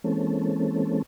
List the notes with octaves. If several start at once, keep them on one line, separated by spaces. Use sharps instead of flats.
E3 G#3 A#3 C4 C#4 A4